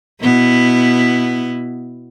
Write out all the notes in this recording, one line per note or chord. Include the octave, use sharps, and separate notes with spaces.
B2 B3 E4